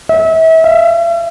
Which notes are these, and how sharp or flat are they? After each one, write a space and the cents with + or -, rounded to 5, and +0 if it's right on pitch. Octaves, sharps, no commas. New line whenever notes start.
E5 -35
E5 +45